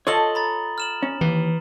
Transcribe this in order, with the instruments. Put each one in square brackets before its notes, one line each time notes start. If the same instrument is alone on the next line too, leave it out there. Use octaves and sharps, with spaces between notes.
[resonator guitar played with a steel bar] F4 A4 D#5 [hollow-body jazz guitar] C#5 [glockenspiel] D#6 F#7 G7
[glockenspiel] A#5 B5 A6
F6 E7 F#7
[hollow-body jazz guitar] C#4
[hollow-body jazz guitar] D#2 [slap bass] E3